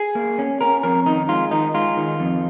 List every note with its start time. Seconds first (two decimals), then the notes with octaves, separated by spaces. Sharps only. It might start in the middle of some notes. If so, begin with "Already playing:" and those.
Already playing: G#4
0.15 A#3
0.39 C#4
0.61 C#4 A#4
0.83 F2 A#4
1.06 D#3 D#4
1.29 G#3 F4
1.51 D#3 D#4
1.74 G#3 F4
1.97 D#3
2.20 F2